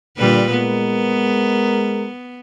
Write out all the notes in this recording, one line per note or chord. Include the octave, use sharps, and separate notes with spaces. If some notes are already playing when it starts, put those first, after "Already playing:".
A#2 D3 G3 B4
G#3 B3 A#4